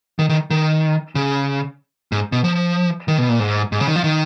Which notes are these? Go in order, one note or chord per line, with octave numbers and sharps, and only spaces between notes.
D#3
D#3
D#3
C#3
G#2
B2
F3
D#3
B2
A#2
G#2
G#2
C#3
D#3
F3
D#3